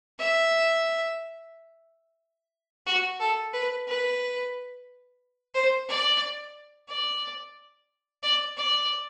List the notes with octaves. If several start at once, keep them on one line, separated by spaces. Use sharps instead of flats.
E5
F#4
A4
B4
B4
C5
D5
D5
D5
D5